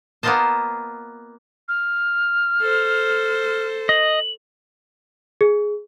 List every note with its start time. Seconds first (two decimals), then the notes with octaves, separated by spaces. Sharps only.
0.23 A#3 B3 F4 C5 D#5 A5
1.68 F6
2.61 A4 C5
3.89 D#5 F#7
5.41 G#4